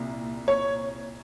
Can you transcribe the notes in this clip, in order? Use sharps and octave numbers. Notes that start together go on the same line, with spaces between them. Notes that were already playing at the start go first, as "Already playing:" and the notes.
Already playing: C2 A#2
C#5